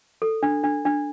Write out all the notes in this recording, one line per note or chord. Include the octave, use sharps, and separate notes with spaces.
A4
D4
D4
D4